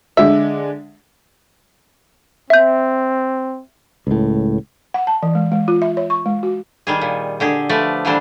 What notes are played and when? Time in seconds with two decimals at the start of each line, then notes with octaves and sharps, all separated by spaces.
0.17 D3 G#3 D4 E5
2.50 C4 E5 G6
4.07 C#2 A2
4.94 F#5
5.07 A5
5.23 E3
5.35 G#3
5.52 G#3
5.68 F4
5.82 E5
5.97 C#5
6.10 C#6
6.26 G#3
6.43 F#4
6.87 D#3 G3 G#4
7.01 A#2
7.40 D3 G4 G#4
7.69 F3 A3 B4 D5
8.05 A#2 D3 E3 G3 D4 C5